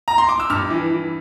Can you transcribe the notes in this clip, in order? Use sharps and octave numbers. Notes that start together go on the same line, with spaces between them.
A#5
C6
D6
E6
G2 F6
E3
E3